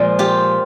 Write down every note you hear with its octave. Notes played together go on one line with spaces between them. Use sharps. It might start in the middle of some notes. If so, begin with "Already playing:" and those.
Already playing: A#2 F3 G#3
F4 G4